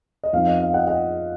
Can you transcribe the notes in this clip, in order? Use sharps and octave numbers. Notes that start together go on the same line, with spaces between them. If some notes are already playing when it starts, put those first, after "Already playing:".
D#5
F2 F3 B3 D#4 F5
D#5
F5
D#5 F#5
D#5 F#5